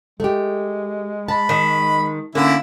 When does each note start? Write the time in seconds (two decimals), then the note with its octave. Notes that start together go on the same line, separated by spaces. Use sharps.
0.20 G#3 A3 G4
1.28 A5 B5
1.49 D#3
2.35 D3 A#3 C#4 E4